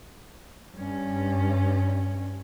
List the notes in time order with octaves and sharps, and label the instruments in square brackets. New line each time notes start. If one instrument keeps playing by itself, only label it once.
[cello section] G2 C#4